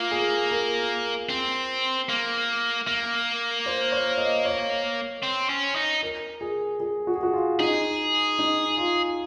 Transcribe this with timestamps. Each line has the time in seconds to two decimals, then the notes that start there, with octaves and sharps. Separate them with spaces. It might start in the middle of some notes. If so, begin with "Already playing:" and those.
Already playing: A#3 F4
0.11 G#4
0.51 A#4
1.29 C4
2.09 A#3
2.87 A#3
3.66 C5
3.92 C#5
4.18 D#5
4.45 C#5
5.23 C4
5.49 C#4
5.76 D#4
6.03 A#4
6.41 G#4
6.80 G#4
7.07 F#4
7.15 G#4
7.23 F#4
7.33 F4
7.59 D#4 G#4
8.39 D#4
8.77 F4